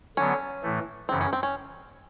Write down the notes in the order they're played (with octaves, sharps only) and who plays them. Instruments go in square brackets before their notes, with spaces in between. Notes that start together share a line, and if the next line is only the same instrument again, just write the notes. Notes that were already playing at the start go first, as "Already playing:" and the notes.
[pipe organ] D3 F#3 B3 [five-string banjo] C#4
[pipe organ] A2 E3 A3
[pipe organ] F#2 C#3 E3 [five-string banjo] C4
[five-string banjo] C#4
C4
C#4